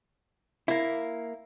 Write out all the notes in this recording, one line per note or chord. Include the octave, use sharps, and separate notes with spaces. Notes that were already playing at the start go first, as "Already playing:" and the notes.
A#3 E4